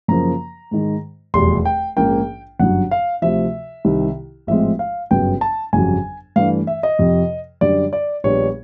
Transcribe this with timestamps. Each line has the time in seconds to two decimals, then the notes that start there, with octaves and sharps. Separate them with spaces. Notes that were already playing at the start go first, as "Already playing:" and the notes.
0.08 F#2 C#3 F3 A#3 A#5
0.71 G#2 D#3 G#3
1.34 F1 E2 B2 G3 C6
1.65 G5
1.96 A#1 G#2 F3 A#3 C#4 G5
2.59 G1 F#2 D3 F#3 F#5
2.91 F5
3.22 D2 C3 F3 E5
3.85 C2 C3 D#3
4.47 A1 G#2 F3 G#3 C4 E5
4.79 F5
5.11 G1 F#2 C#3 F#3 B3 G5
5.41 A5
5.73 G1 F2 C#3 F#3 G#5
6.36 G2 E3 A3 D4 F5
6.67 E5
6.83 D#5
6.99 F2 C3 F3
7.61 F#2 D3 G3 D5
7.93 D5
8.24 A#1 A#2 G3 B3 D4 C#5